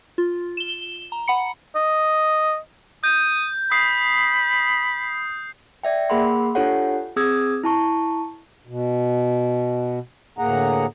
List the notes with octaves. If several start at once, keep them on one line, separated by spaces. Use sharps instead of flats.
F4
E7 G7
A#5
F#5 B5 C#7
D#5
D#6 G6
B5 D#6 G6 C7
D5 E5 G5
A#3 G#4 A#4 F#5 B5 C6
D4 F4 G4 A4 C#5 F#5
C4 G#4 D#6 E6 G#6
E4 A5 C#6
B2
D2 A2 A#3 G#4 F#5 A#5